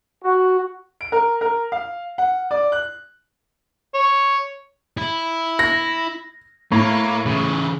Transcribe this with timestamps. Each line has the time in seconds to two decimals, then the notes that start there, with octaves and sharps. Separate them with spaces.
0.24 F#4
1.01 D7
1.12 A#4
1.41 A#4
1.72 F5
2.18 F#5
2.51 D5
2.72 F#6
3.95 C#5
4.97 E4
5.59 A#6
6.72 A2 A#3
7.26 C#3 E3